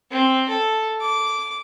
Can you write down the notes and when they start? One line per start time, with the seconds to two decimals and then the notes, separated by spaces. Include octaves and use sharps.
0.11 C4
0.49 A4
1.01 D6